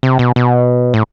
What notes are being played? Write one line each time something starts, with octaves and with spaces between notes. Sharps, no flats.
C3
B2
B2
A2